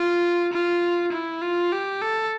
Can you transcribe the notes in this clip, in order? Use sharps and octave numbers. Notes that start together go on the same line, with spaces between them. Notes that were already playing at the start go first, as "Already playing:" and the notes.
Already playing: F4
F4
E4
F4
G4
A4